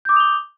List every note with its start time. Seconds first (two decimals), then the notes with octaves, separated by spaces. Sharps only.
0.05 G6
0.09 D6
0.13 D#6
0.16 F7
0.20 G7